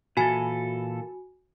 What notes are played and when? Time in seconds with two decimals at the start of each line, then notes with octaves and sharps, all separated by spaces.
0.17 A#2 E3 F#4 A4 G#5